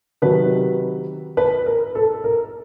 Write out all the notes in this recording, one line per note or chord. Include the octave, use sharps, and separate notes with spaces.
C3 D#3 F#3 B4
B4
A#4
A4
A#4